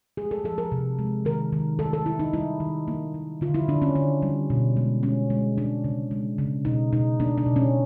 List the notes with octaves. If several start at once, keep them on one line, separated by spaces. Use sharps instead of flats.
G#3 G#4
A4
F3 A4
A#4
C3
G#3
D#3 A#4
D#3
D#3 A4
A4
D#3 E4
D#4
G3 E4
D#3
A#3
A#3
D3 F4
E4
D3 D4
C#4
D3 D4
G3
B2
G#3
G#3 C#4
G#3
G#3 D4
C#3
G#3
C#3
B2 D#4
B2 D#4
A#3 D4
D4
B2
C#4